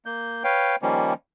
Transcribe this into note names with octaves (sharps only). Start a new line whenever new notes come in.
A#3 G6
B4 C#5 F5 G5
D#3 F3 G3 A#3 C#4